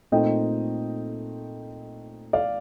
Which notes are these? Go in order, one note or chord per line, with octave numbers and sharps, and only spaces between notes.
A#2 A3 C4 D#4 D#5 G5
D5 F5